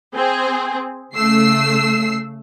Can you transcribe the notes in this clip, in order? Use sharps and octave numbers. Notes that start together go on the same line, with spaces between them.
C4 G#4
C#3 A3 E6 C7